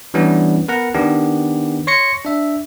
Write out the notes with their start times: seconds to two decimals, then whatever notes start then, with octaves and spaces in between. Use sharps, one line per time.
0.14 E3 G3 B3 C#4 D4 E4
0.68 B3 A#4 B4 F#5 A#5
0.95 D#3 B3 D4 G4
1.87 C#5 C6 C#6 A#6 C#7
2.25 D4 E5